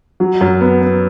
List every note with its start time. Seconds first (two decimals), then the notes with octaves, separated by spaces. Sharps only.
0.20 F#3
0.41 F#2
0.61 B3
0.82 B3